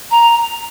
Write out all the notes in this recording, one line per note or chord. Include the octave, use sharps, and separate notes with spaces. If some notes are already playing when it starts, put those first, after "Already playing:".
A#5